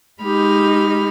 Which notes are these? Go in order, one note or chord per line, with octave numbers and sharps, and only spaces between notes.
G#3 D#4 G4 B5 F6